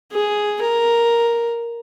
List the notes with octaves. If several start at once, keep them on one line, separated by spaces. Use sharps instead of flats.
G#4
A#4